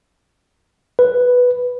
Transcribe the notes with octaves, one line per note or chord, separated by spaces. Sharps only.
B4